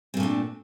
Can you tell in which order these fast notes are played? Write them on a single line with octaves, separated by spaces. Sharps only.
C4 A#2 A3 D4